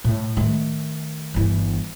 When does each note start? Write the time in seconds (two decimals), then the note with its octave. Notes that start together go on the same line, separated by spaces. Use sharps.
0.04 A2
0.37 D#3 A3
1.34 G1 E3